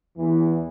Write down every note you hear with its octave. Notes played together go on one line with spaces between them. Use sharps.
E2 E3